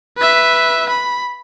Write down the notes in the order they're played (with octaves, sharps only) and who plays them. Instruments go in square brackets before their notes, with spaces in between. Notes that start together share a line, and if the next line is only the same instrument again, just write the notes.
[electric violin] B4 E5
B5